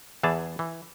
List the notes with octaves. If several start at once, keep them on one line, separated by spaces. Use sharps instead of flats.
E2 E3 G#4 A5
E3